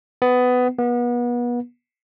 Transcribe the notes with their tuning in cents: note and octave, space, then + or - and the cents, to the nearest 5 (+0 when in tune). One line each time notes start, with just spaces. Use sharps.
B3 +15
B3 -35